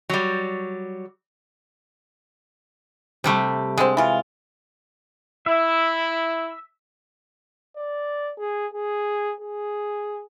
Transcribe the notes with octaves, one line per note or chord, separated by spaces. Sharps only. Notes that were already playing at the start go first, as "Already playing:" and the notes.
F#3 G3
C3 G3 A3
D3 G#3 C4
E3 F4
E4 E5
D5
G#4
G#4
G#4